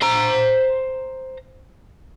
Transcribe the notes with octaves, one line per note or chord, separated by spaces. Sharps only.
C5 A#5